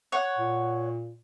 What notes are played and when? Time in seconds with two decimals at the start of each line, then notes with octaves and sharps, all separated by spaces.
0.12 C#5 F#5
0.38 A#2